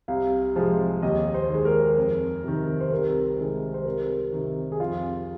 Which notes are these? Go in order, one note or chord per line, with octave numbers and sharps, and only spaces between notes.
C2 F5
C3 F3 G#3
D#2 D#5
C5
D#3 G#3
A#4
F2
C3 D#3
C5
C2 A#4
C3 D#3 G#3
C5
C2 A#4
C3 D#3
G#4
F2 F4